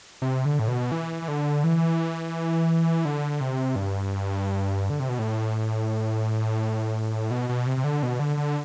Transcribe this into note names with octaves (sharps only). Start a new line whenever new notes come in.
C3
D3
A2
B2
E3
E3
D3
E3
D3
C3
G2
D3
C3
B2
A2
B2
B2
C3
C3
D3
B2
D3
D3